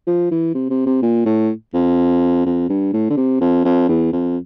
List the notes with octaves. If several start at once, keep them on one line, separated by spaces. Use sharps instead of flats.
F3
E3
C3
C3
C3
A#2
A2
F2
F2
G2
A2
D3
C3
F2
F2
E2
F2